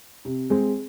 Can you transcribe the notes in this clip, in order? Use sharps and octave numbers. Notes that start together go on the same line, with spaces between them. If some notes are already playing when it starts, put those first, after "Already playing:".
C3
G#3 C4